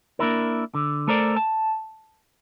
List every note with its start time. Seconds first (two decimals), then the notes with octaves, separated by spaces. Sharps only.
0.19 A#3 D4 E4 A#4
0.75 D3
1.07 A3 A4 A#4 C5 D5
1.36 A5